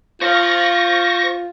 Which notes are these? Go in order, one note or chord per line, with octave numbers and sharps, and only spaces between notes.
F4 C5 F5 C#6 A#6